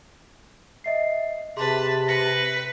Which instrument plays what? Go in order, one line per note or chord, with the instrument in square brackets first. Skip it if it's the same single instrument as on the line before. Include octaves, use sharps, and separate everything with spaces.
[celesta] D#5 E5 C7
[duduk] C3 [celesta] G#4 C6 [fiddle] B4 A5
[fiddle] B4 [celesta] A#6 C#7